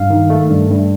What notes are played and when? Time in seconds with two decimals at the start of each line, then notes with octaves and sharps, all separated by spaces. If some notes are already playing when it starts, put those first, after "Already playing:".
Already playing: G2 F5
0.10 D#3
0.30 A3
0.50 G2
0.70 G2